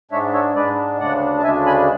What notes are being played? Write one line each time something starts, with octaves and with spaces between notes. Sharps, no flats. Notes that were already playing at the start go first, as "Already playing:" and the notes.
G#2 G#3 D4 C#5 E5
C#5 E5
G#2 G#3 D4 B4 D5
D2 C#3 G#3 D4 D5 F#5
A5
D2 C#3 G#3 D4 E5 G#5
G#5 B5